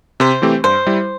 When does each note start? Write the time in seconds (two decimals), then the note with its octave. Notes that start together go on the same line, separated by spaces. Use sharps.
0.20 C3 C5
0.42 E3 A3 C4 G4
0.64 G2 C5
0.86 G3 E4